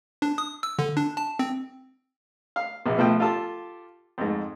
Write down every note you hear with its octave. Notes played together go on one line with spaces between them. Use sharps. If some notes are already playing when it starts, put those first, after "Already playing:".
D4
D#6
E6
D3
D4
A5
C4
F5
A#1 B2 B3
B2 F3 A3 G5
F4 G4 A4 A5
F2 G#2